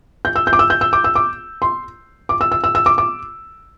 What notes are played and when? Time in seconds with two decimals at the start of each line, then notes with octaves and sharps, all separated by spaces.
0.25 G6
0.36 E6
0.47 G6
0.53 D6
0.59 E6
0.70 G6
0.81 E6
0.93 D6
1.04 E6
1.16 D6
1.62 C6
2.29 D6
2.41 E6
2.52 E6
2.64 E6
2.75 E6
2.86 D6
2.98 D6